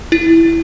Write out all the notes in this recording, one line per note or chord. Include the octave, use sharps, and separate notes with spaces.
E4